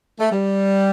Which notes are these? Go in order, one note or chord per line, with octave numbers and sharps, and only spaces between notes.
A3
G3